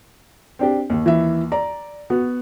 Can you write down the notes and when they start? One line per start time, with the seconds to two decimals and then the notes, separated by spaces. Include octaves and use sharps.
0.59 C4 D4 G4
0.90 D#2
1.06 E3 E5
1.52 D5 A#5
2.10 B3 F#4